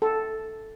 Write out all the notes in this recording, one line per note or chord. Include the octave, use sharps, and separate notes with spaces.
A4